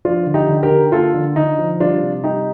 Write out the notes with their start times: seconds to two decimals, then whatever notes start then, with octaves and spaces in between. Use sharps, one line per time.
0.05 F3 D4 F4
0.27 D3
0.34 D#4 G4
0.49 D3
0.63 G4 A#4
0.70 D3
0.92 A#3 F4 A4
1.14 D3
1.36 D3 D#4
1.58 F3
1.80 G3 D4 F4
2.02 C3
2.24 G3 D#4 G4